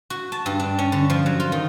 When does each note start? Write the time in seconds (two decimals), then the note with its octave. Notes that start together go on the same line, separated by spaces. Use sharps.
0.10 F#4
0.32 A5
0.46 G2
0.60 D4
0.79 C#4
0.92 D3
1.10 F3
1.26 F#3
1.40 F4
1.52 D#3